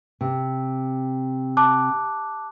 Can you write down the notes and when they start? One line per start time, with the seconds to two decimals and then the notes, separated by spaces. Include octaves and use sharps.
0.21 C3
1.57 A5 D6 F#6